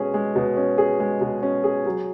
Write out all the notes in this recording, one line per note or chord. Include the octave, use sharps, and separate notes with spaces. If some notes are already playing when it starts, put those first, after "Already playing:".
Already playing: B2 G#3 C#4 G#4
G#3
B2
C#4
G#4
G#3
B2
C#4
G#4
F#3